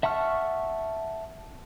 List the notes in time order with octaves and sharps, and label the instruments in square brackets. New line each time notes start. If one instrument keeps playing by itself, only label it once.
[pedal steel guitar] E5 F#5 A5 C#6 F6